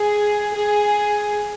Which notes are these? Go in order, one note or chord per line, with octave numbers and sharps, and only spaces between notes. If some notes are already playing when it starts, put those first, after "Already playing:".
Already playing: G#4
G#4